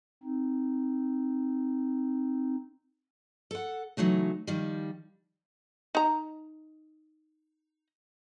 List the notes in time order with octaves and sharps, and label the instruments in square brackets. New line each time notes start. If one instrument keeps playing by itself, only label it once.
[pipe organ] C4 D#4
[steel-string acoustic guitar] A4 F#5
C#3 E3 F#3 A3 D#4
D#3 F3 G3
[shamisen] D#4 A#5